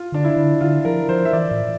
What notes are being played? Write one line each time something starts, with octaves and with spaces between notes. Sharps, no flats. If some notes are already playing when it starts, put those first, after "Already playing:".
Already playing: F4
D3 D4
E4
D3
D3 F4
F3 A#4
F3 C5
E5
E3 D5
A2